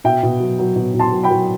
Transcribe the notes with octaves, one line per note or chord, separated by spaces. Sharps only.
B2 E5 G5
B2
F#3
F#3
B2
B2
A5 C6
F#3
G5 B5
F#3